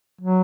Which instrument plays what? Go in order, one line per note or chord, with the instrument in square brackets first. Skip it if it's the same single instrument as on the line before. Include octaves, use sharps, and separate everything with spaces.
[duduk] F#3